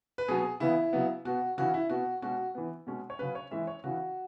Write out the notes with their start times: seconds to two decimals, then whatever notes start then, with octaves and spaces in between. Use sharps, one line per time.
0.18 B4
0.28 B2 F#3 B3 G#4
0.60 C#3 E3 B3 E4
0.93 C#3 F#3 B3
1.25 B2 B3 F#4
1.58 C#3 E3 C#4 F#4
1.74 E4
1.90 B2 B3 F#4
2.22 B2 G#3 C#4 F#4
2.55 E3 B3
2.87 B2 G#3 C#4
3.10 C#5
3.19 C#3 F#3 C#4 B4
3.35 C#5
3.51 E3 G#3 C#4 E5
3.67 C#5
3.84 C#3 E3 C#4 F#4